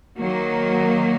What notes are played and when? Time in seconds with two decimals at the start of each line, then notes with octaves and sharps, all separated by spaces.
0.19 D#3 F#3 A#3